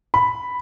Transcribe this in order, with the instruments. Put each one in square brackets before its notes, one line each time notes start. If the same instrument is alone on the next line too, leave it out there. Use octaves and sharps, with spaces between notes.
[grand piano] B5